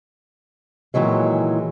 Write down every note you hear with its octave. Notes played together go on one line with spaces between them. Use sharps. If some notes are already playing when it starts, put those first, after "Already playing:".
A#2 D#3 E3 F#3 G#3